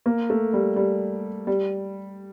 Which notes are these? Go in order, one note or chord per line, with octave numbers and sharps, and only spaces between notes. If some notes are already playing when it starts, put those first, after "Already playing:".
A#3
A3
G3
G3
G3